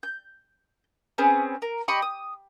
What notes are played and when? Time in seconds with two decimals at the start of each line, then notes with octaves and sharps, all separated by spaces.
0.03 G6
1.18 C4 C#4 G#4 B4
1.62 A#4
1.88 G4 D#5 B5 C#6
2.02 D#6